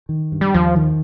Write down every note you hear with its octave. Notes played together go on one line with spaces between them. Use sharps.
D#3
G2
G3
D#2 F3
D#3